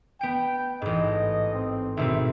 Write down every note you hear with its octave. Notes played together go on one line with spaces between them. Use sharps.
B3 G5 D7
A1 G#2 D#5
C4
G#1 B2 C4 E5